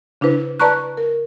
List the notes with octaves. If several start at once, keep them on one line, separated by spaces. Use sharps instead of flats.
C#3 D4 E4 B4 C5
B4 D5 A5 A#5 C#6 F#6
A#4